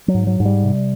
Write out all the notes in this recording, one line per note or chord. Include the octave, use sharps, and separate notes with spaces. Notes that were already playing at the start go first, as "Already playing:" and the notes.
F#3
G#2
F#3
G#2
G3
C3